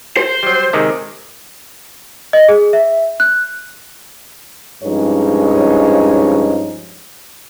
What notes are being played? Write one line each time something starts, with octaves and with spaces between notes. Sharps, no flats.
C5
F#3 G3
C3 D#3 G#3
D#5
G#4
E5
F#6
G2 F3 G#3 C#4 D#4 C#5